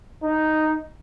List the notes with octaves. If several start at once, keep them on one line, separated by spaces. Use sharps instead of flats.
D#4